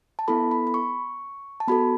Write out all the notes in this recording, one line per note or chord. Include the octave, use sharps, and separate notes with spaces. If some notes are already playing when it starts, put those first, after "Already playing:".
A5
B3 E4 A4 B5
B5
B5
C#6
A5
B3 F#4 A4 B5